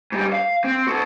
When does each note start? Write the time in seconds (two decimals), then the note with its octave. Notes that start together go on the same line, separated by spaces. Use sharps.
0.12 G#2 G3
0.33 F5
0.64 C4
0.87 F#4 A4